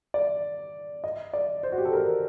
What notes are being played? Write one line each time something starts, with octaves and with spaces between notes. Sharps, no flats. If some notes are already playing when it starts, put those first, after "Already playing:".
D5
D#5
D5
C5
F#4
G4
A4
A#4